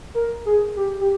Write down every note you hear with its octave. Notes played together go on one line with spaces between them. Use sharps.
A#4
G#4
G4
G4